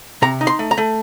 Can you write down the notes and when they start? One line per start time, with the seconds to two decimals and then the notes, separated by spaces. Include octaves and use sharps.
0.22 C3 A#5
0.41 D#4
0.47 C6
0.59 A3
0.71 A#5
0.78 A3